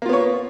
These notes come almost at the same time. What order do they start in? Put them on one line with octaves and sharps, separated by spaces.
A#3 F4 B3 C#5